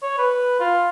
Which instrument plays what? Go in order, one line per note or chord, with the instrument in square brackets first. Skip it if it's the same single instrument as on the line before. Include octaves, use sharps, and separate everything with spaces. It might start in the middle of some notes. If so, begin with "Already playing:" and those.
[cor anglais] C#5
B4
F4